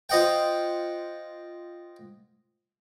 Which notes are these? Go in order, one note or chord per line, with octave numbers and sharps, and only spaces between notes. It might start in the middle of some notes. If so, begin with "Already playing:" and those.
F4 C5 D#5 F#5 G5